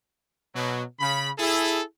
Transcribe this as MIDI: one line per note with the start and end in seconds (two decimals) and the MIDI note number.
0.54 0.83 47
0.54 0.83 54
1.00 1.30 49
1.00 1.30 83
1.38 1.82 64
1.38 1.82 68
1.38 1.82 69